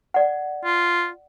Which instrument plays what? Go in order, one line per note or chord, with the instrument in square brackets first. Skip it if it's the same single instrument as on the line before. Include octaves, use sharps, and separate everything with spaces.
[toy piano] D5 F#5
[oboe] F4